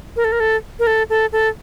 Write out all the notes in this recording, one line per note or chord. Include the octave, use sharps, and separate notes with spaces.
A#4
A4
A#4
A4
A#4
A4
A4
A4